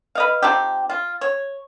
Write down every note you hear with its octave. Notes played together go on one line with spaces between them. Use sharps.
B4 D#5 F5
F3 C4 D#4 G4
F4
C#5